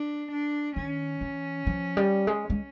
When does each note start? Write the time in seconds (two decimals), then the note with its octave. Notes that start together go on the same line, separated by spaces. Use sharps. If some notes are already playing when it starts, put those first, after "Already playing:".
Already playing: D4
0.31 D4
0.76 D#3 C#4
1.21 E3
1.67 F3
1.97 G3
2.27 G#3
2.50 G#3